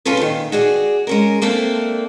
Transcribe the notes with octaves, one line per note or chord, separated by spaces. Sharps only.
C3 C#4 F4 G#4 A4 B4
A#2 D#3
F#4 G#4 D5
G#3 C#4 A#4
A3 A#3 C4 D4 A4